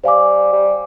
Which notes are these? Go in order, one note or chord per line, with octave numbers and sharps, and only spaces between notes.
G3 C5 F5 G#5 D6
G3